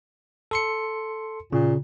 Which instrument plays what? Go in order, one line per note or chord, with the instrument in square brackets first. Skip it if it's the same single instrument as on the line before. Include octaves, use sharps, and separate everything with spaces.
[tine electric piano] A4 C6 C#7
[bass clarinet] A#2 [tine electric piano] C#3